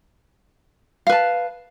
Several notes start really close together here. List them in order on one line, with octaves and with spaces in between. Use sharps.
F5 B4 A5